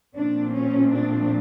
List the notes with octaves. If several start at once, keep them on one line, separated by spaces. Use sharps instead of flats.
A#2 F3 A3 C4 D4
C#4
D4